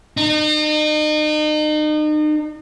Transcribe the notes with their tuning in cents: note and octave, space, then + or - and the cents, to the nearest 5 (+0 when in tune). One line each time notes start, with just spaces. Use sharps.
D#4 -35